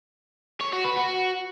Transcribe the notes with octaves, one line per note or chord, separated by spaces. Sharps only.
C#5
F#4
B4
F#4